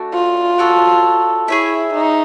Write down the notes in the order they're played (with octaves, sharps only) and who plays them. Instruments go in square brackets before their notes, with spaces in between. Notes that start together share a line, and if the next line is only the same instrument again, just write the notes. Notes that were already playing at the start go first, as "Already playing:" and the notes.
Already playing: [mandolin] A3 D4 F#4
[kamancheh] F4
[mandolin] D4 F#4 A4 C#5
[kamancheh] E4 [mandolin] G#4 C#5 E5
[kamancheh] D#4